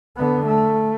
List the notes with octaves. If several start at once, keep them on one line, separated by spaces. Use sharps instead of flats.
D3 B3
A3